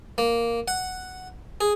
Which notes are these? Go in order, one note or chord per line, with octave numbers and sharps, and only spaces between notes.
A#3
F#5
G#4